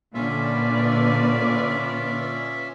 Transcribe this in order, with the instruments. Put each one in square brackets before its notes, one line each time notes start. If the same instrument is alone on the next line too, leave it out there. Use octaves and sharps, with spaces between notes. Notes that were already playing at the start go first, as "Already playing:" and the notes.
[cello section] A#2 D3 [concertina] C#4 F4 E5 [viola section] B4 D5